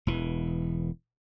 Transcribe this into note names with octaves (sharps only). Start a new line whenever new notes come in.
E1 E3